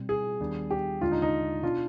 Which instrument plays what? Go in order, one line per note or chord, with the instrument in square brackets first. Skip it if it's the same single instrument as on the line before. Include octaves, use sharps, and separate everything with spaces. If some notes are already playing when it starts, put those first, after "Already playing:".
Already playing: [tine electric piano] B2 G3 C4
[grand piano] G#4
[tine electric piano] D#2 D#3 G3 B3 D4
[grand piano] G4
[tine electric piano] D#2 D3 G#3 D4 [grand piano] F4
[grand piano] D#4
D#4
[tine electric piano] B2 B3 D4 [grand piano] F4